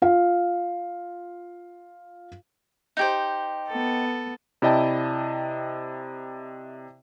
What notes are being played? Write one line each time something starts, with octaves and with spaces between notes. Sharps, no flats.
F4 F5
D#4 G4 C5
B3 A4
C3 E4 D5 D#5 G5 A5